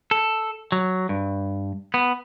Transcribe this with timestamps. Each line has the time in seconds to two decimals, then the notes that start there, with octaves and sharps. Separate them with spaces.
0.11 A4
0.72 F#3
1.09 G2
1.94 B3